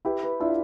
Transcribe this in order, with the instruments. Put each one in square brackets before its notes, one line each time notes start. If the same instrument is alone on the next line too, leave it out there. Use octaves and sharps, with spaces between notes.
[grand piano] E4 G4 [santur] B4
[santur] B4
[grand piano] D4 F4 [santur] E4